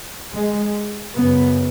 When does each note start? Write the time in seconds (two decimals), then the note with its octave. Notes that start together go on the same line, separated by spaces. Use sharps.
0.32 G#3
1.16 F#2 C#3 B3